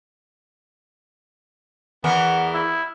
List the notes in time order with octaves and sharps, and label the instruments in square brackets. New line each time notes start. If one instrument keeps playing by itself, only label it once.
[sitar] E2 E3 A#4 [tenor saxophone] B3
[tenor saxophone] E4